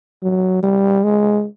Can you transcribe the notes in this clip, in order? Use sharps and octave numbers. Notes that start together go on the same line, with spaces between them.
F#3
G3
G#3